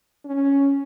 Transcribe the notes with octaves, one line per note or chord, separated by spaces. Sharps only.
C#4